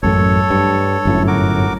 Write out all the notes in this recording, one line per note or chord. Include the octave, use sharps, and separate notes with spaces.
A1 F#2 A3 A4 C#5
G2
G1 F#2 A2
F#4 A#4 D6